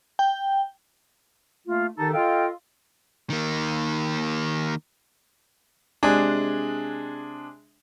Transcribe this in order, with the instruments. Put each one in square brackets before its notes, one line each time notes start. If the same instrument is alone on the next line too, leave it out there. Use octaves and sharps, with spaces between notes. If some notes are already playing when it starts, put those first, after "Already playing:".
[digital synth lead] G5
[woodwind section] A3 A#3 F4
D#3 D#4 G4 A4
F4 A4 D#5 F5 G5
[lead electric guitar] D#3 A#3
[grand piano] C3 G#3 D4 G#4